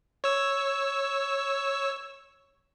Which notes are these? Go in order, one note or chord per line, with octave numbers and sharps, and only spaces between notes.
C#5 E6